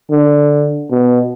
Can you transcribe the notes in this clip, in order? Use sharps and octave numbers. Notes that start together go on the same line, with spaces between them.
D3
B2